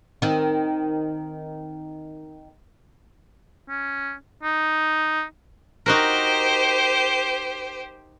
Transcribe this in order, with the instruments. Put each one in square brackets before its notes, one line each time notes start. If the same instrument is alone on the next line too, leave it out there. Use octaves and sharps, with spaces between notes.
[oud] D#3 C4
[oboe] C#4
D#4
[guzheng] D#4 F#4 A#4 [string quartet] G4 C5